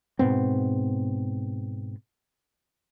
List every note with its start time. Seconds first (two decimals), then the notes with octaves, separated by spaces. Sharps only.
0.19 G#2 B2 B3 C4